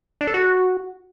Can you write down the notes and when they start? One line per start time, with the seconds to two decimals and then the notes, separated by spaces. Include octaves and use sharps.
0.21 D4
0.27 A4
0.34 F#4